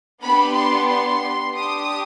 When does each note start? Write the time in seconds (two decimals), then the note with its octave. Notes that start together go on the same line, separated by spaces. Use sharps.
0.21 B3 D4 G4 B5
0.53 C6
0.87 C6
1.52 D4 G4 D#6